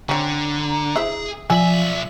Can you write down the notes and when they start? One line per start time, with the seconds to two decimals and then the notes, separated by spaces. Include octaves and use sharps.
0.09 D3 C4 C#4 A#5
0.96 E4 G#4 C5 E5
1.50 B1 F3 D5 E5 G#5 E6 F#7